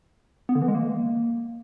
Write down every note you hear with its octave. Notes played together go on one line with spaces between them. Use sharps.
B3
D3
E3
G#3
A#3